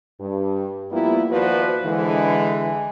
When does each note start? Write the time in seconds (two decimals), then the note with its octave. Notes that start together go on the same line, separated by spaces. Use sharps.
0.20 G2
0.92 F3 G3 A#3 B3 E4 F4
1.31 D#2 F3 F#4 B4 C5 D5
1.85 D3 E3 G#3